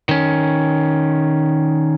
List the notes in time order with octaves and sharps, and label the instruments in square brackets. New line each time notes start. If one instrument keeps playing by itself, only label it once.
[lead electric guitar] D#3 C#4